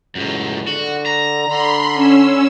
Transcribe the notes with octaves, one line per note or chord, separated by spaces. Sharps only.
C#2 F#2 A2
D3 F#4
A#5
D3 B5 C6
C#4 E6